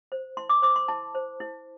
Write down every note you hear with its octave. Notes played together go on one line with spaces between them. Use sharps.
C5
E4 C6
D6
C5 D6
C6
E4 A5
C5
E4